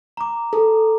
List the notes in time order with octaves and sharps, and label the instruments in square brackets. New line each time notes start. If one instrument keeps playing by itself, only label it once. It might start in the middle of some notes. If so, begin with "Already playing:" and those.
[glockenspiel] A#5 D6
[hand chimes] A4